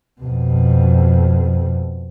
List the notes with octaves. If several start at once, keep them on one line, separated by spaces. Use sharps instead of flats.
F2 B2